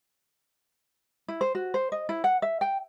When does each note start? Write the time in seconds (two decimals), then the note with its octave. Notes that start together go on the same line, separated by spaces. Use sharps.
1.28 E4
1.41 C5
1.55 F#4
1.74 C5
1.92 D#5
2.09 E4
2.24 F#5
2.42 E5
2.61 G5